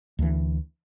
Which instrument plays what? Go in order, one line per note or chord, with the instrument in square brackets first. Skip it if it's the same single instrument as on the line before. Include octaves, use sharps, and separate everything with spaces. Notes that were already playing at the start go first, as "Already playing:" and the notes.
[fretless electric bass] D2 E3